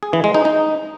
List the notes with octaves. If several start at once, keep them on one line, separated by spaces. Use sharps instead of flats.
G#4
E3
G#3
D#4
D#4